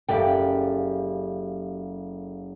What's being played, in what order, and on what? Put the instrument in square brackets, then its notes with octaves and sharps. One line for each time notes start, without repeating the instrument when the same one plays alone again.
[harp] F#1 [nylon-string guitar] G4 D5 G5 [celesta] A4 E5 F5